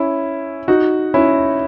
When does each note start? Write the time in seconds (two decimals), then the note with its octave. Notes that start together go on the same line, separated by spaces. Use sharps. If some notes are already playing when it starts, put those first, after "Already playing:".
Already playing: C#4 E4
0.68 D#4 F#4
1.14 C#4 E4